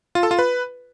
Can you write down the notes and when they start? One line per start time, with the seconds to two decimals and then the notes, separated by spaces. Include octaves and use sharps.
0.15 F4
0.23 A4
0.31 F4
0.39 B4